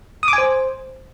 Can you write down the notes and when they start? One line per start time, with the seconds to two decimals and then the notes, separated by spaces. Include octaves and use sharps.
0.23 D#6
0.28 D6
0.33 G#5
0.38 C5